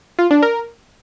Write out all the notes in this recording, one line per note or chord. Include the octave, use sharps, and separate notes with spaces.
F4
D4
A#4